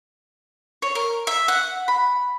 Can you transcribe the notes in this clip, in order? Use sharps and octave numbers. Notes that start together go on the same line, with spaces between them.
C#5
A#4
E5
F#5
B5